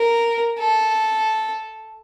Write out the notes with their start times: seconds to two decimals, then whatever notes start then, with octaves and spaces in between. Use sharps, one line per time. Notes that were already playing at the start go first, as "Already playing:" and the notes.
Already playing: A#4
0.59 A4